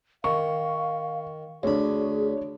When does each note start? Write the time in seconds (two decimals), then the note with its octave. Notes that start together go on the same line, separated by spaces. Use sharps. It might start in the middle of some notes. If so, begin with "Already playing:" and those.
0.24 D#3 F5 C#6
1.63 D2 D4 G#4 C#5 B5